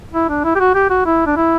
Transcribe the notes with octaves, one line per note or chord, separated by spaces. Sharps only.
E4
D4
E4
G4
F#4
G4
F#4
E4
D4
E4